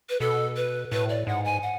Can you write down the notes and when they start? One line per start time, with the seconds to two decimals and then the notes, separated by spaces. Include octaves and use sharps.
0.10 B4
0.20 B2 A4
0.56 B4
0.92 A2 B4
1.09 D5
1.27 G#2 F#5
1.45 G#5
1.63 F#5